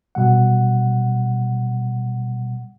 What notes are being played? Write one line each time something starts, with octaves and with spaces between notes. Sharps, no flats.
B2 G3 F#5